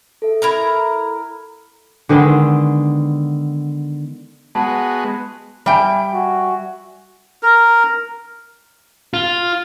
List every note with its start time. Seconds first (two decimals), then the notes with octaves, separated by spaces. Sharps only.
0.22 A4 E5
0.42 E4 A#4 A#5
2.09 D3 D#3 G#3 B3
4.55 G#3 B3 F#4 A5
5.66 G3 E5 G5 G#5
6.14 F#4
7.43 A#4
9.14 F4